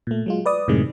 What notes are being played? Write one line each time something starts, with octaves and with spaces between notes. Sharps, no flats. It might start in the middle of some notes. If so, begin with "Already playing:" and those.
A#2 A3
F#3 G#3 F4
B4 D5 D#6
F#2 A2 C3 D#3 G#3